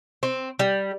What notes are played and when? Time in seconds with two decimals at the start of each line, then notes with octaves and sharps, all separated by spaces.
0.23 C4
0.59 G3